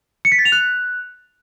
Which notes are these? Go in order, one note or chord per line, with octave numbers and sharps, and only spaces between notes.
C#7
B6
A6
F7
F#6